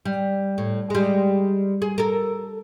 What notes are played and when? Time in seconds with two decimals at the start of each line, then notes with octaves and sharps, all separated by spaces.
0.05 G3
0.58 A2
0.90 G3 G#3
1.82 G#4
1.98 A4 A#4